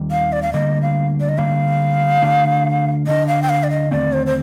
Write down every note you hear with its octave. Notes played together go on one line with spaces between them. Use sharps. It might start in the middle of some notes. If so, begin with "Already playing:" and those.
Already playing: D#2 D#3 G3 C4
F5
D5
F5
D2 D3 G3 A#3 D#5
F5
D5
D#5
D2 D3 G3 A#3 F5
D2 D3 A3 D4
D2 D3 A3 D4 D#5
F5
G5
F5
D5
D#5
D#2 D3 A3 C4 D5
C5
C5